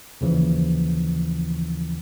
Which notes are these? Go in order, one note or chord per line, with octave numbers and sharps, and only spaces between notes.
D#2 C#3 E3 F3